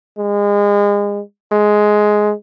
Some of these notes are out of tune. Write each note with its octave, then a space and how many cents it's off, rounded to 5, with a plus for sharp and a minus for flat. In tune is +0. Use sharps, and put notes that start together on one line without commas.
G#3 -30
G#3 +10